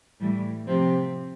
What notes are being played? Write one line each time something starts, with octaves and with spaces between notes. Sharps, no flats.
A2 E3 G3
C3 F3 C4 G4